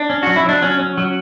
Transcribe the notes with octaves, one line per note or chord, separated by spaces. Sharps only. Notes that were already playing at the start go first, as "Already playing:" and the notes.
Already playing: D4
C#4
F#3 F#4
E4
F#3 D4
F#3 C#4
C#4
F#3